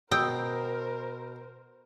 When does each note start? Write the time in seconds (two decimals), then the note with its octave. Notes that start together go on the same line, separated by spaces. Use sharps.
0.12 B2 A#4 C5 G5 D#6 E6